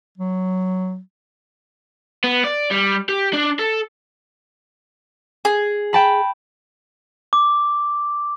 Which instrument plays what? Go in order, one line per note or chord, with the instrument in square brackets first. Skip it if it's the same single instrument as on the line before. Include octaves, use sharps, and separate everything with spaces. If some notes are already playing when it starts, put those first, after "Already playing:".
[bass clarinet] F#3
[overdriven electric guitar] B3
D5
G3
G4
D4
A4
[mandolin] G#4
[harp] G5 A5 B5
[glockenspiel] D6